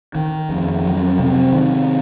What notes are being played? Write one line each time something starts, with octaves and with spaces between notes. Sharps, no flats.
D#3
F2
F#3
C3
D#3